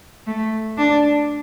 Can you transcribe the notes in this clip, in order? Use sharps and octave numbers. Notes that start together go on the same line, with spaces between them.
A3
D4